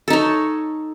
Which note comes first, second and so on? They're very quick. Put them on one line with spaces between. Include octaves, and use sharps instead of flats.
A4 D#4 C#5